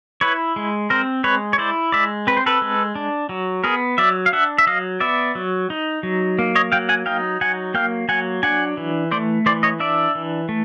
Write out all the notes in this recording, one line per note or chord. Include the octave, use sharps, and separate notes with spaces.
E4 B4 C#5
G#3
C4 A#4 C5
G#3 B4 C#5
C#5
E4 C5 D5
G#3 D5 E5
C4 B4
C5
A4 B4
G#3
D4
F#3
B3 G#4 A#4
F#3 D5 E5
F5
D4 E5 F#5
E5
F#3 D#5 F5
B3 D5 E5
F#3
D#4
F#3
A#3
C#5 D#5
F#3 F5 G5
F#5 G#5
D#4 F5 G5
F#3 F#5 G#5
A#3 F5 G5
F#3 F#5 G#5
D4 F#5 G#5
E3
A3 C5 D5
E3 C5 D5
C#5 D#5
D4 D5 E5
E3
A3